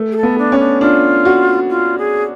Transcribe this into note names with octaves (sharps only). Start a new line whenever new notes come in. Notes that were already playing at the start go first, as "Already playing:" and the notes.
Already playing: A3
G#4
A4
B3
D4
C#4
D4
D4 F4
F#4
F4
G#4